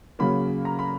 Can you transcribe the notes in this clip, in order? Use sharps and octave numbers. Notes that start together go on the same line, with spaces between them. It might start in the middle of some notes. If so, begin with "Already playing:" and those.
C#3 F#3 A#3 B5
A#5
B5